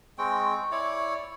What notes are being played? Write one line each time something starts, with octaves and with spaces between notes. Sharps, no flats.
G#3 C4 G5 C#6
E4 C#5 D5